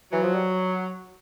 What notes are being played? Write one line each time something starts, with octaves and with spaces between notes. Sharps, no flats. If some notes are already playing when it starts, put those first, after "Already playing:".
E3 F#3
F3
G3